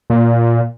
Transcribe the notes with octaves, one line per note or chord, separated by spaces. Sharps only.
A#2